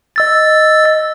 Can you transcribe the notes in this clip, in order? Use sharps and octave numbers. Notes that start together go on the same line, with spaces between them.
D#5 E6 A6